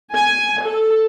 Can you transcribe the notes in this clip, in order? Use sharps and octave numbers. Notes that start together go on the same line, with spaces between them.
G#5
A4